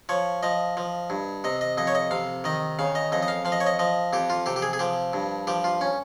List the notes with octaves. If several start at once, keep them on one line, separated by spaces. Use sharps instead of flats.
F3 C#5
F3 D#5
F3
G2
C3 D#5
D#5
F2 D#5
C#5
D#5
C3 F5
D#3 D#5
C#3 F5
D#5
F2 D#5
D#5
F5
F3 F5
D#5
C#5
D#5
F3 D#5
F2 G4
F4
C3 G4
G4
G#4
G#4
F3 G4
G2
F3 G4
F4
C#4